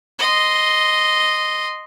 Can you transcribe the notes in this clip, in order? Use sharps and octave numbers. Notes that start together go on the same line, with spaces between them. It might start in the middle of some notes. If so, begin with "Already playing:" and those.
D#5 C6